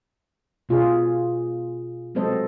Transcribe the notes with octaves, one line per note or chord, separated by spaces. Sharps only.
B2 F4 G#4
F#3 G#3 C4 A4 C5 D#5